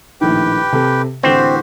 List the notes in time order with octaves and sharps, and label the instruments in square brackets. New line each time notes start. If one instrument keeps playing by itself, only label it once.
[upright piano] A#1 A2 D#3 [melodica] G4 B4 G5
[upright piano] C3 A4
[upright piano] A2 D3 E3 [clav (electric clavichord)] C4 [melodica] F#4 G4 C5